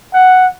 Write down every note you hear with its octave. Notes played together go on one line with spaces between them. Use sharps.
F#5